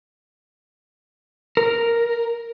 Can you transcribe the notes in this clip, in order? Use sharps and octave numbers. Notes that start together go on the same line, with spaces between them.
A#4